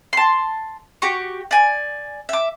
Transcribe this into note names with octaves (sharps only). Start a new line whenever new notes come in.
A5 C6
F#4 G4 C#6
D5 G#5
E5 D6